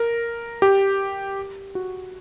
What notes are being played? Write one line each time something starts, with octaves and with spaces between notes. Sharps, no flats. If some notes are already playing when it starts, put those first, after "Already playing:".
Already playing: A#4
G4
F#4